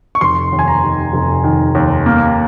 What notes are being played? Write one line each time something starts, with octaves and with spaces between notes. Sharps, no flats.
C#6
F1 C6
D#2
G#5
A#5
D#3
F1
D#3
D#2
A#3